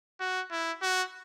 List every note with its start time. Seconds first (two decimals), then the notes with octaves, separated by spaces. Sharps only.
0.20 F#4
0.51 E4
0.82 F#4